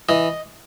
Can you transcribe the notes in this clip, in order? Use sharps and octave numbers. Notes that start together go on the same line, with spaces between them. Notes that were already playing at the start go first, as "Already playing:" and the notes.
E3 D#5